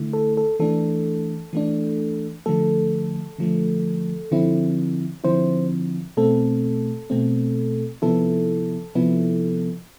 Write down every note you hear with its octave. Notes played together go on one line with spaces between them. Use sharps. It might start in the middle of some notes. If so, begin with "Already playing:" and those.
Already playing: D3 A3 E4
A4
A4
E3 A3 D4 A4
E3 A3 D4
D3 F3 A3 A4
D3 F3 A3
D3 F3 C4 E4
D3 F3 C4 E4 C5
B2 A3 C4 A4
B2 A3 C4
C3 F3 B3 E4 A4
C3 F3 B3 E4